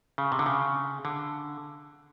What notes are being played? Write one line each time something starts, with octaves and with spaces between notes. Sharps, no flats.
C#3
C3
D3
C#3
D3